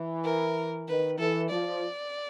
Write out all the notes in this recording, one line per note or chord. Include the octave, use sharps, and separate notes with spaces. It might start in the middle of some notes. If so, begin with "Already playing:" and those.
Already playing: E3
A#4
D#3 B4
E3 A4
F3 D5